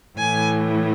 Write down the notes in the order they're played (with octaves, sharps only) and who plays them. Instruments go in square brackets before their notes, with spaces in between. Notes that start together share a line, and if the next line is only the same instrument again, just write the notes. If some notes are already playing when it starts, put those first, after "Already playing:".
[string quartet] A2 E3 G#5